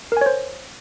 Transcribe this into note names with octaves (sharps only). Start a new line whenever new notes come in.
A#4 C5 C#5 G#5